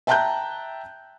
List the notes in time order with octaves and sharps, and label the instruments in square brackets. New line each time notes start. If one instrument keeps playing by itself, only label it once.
[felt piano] E5 G5 A5 A#5 F#6 G6